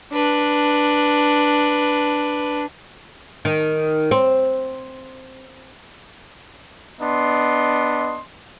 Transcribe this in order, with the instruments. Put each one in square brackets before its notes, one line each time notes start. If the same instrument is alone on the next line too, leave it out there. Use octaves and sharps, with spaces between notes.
[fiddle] D4 B4
[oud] D#3
C4
[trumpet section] B3 D4 D#5 C6